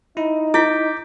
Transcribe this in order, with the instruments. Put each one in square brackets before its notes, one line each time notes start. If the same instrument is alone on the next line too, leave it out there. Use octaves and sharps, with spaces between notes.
[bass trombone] D#4 [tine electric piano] E4
[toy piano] E4 [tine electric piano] D6 G6 B6